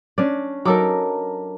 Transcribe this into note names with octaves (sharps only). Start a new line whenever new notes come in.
C#4 D4 D5
F#3 D#4 A4 A#4 D6